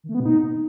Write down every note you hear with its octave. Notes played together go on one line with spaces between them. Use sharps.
D#3
A3
B3
B2
D#4